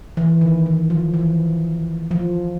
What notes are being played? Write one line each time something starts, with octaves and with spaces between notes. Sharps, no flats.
E3
D#3
E3
F3
E3
F3